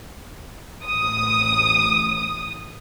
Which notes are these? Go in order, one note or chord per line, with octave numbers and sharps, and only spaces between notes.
A1 D#6